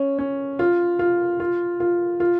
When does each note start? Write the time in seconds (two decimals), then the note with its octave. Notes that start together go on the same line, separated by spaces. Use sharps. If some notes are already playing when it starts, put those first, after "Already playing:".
Already playing: C#4
0.19 C#4
0.59 F4
0.99 F4
1.40 F4
1.80 F4
2.20 F4